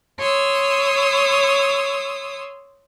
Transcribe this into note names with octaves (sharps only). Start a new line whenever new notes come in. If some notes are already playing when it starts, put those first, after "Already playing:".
C#5 C6 D#6 E6